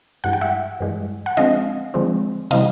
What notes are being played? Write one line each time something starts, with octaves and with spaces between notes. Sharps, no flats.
G2 E3 G#3 F#5
G5
E5 F#5
G2 E3 G#3
F#5
D3 F3 G#3 C4 D#5 F5
D3 F3 G#3 C4
C3 E3 G3 D#5 F5